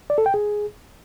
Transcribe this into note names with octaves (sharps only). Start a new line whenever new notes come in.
D5
A4
G5
G#4